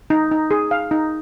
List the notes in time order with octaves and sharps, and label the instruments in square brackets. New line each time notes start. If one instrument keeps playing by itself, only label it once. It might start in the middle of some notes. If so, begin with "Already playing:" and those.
[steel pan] D#4
D#4
G#4
F5
D#4